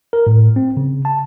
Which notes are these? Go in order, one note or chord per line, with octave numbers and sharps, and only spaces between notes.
A#4
A2
C4
C#3
A5